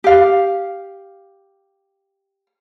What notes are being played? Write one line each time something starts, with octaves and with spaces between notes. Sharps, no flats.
G4 F5